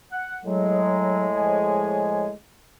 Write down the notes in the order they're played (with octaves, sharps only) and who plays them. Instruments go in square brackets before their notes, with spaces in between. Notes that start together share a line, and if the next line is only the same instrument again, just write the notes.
[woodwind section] F#5
[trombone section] A2 G#3 [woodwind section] F#3
[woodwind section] F3 C#5 G#5